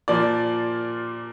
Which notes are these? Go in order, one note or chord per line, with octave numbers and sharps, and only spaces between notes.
A#2 F3 A#3 D5